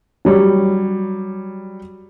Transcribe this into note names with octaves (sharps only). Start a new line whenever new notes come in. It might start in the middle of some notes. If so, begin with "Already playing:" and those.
F#3 G3 C#5